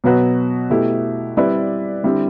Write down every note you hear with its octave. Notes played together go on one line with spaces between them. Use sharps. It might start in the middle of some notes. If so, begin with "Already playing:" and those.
B2 F#3 B3 F#4 B4
B2 A3 E4 G4
G3 C4 E4 B4 D5
D3 G3 C4 E4